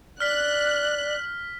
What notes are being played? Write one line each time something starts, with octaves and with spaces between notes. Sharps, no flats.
D5 F6 F#6 B6